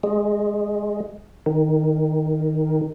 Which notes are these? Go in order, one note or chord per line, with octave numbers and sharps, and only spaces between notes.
G#3
D#3